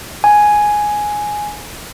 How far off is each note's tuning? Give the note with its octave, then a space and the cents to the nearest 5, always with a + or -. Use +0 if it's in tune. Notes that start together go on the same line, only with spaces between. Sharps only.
G#5 +5